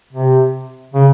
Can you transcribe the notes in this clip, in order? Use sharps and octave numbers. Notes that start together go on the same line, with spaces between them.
C3
C#3